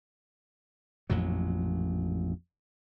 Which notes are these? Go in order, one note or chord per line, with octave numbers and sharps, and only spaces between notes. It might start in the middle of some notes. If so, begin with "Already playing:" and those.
A1 F2 A#2 F#3